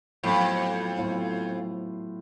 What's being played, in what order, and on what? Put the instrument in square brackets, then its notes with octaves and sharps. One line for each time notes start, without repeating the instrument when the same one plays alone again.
[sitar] F2 [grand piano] A2 F#3 B3 F4
[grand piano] A2 F#3 B3 F4